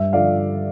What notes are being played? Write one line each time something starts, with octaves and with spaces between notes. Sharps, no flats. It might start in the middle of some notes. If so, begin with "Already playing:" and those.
Already playing: G2 E5
D3 F3 D5 F5